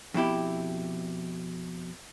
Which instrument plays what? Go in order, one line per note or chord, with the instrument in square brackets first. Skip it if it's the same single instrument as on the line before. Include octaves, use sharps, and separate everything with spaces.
[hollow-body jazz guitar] F2 B2 E4 G4